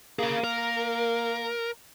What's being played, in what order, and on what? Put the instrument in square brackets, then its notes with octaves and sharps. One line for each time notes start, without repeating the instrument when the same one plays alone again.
[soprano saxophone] A#3 [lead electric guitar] G#4 F5
[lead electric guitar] A#4